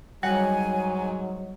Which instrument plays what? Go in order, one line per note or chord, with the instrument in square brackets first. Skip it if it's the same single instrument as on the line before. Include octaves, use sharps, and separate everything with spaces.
[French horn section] G#2 F#3 [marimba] G3 [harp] F#5 [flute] G#5